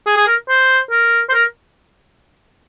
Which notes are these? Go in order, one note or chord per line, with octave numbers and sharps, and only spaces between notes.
G#4
G#4
A#4
C5
A#4
C5
A#4